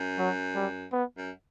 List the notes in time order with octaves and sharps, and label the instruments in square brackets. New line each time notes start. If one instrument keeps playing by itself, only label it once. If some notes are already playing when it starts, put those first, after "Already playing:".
Already playing: [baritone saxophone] F#2
[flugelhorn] F#3
G3
B3
[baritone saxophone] F#2